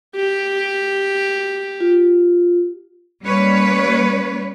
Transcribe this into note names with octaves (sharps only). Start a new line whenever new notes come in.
G4
F4
G3 A#3 C#4 B4 C#5